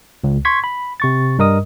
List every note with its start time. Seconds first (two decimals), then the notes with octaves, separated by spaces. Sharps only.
0.24 C#2
0.45 C6 C#6 G#6 B6
0.64 B5
1.00 C3 C#6 A6
1.38 G2 G3 A#4 D#5 D#6